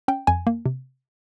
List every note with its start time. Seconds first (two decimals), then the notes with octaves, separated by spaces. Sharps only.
0.08 C#4 G5
0.27 F2 G#5
0.47 A#3
0.66 C3